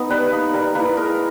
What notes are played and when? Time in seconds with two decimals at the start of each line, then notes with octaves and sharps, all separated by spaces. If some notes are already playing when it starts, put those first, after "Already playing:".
Already playing: B3 D#4
0.10 G3 B4
0.31 A#3 D#4
0.53 G3 A#4
0.75 A#3 E4 B4
0.97 G#3 A#4